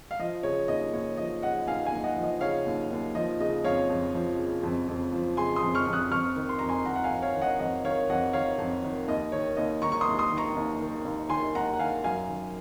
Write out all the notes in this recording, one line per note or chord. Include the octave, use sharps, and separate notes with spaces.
F5
F3 D#5
C#3 C#5
D#2 D#5
D#2 C#5
F3 D#5
C#3 D#5 F#5
D#2 F5 G#5
F5 G#5
D#2
D#5 F#5
F3
D#5
C#3 C#5 F5
D#2
D#2
F3 D#5
C#3 D#5
F2 C#5 F5
F2
F3
C#3
F2
F2
F3
C#3 G#5 C6
C6 D#6
F2
C#6 F6
F2
D#6 F#6
F2 C#6 F6
D#3
C6
F2 A#5
G#5 C6
D#3 F#5 A#5
F#5
F5 G#5
F2
C#5 F5
D#3
D#5 F#5
F2 D#5 F#5
D#3 C#5 F5
F2 D#5 F#5
D#3 C#5 F5
F2
D#3
D#2 D#5
D#3 C#5
D#2 D#5
D#3 A#5 C#6
C#6
C6 D#6
D#2
C6 D#6
D#3
A#5 C#6
D#2
D#3
D#2
D#3 G#5 C6
D#2 F#5 A#5
F#5
D#3 F5 G#5
F#2 F5 G#5
D#3